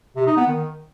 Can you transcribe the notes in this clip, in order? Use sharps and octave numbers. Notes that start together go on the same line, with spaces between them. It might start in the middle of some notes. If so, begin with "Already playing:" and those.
C3
D#4
B3
D#3